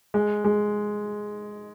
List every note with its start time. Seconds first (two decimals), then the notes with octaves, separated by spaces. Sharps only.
0.14 G#3
0.44 G#3